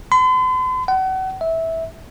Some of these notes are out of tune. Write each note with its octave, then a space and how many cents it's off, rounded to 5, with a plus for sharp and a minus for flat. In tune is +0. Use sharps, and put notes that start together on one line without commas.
C6 -45
F#5 +35
E5 -15